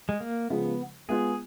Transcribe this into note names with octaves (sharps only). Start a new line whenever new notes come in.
G#3
A#3
C#3 F3 G#3 B3
G#3 B3 F4 G#4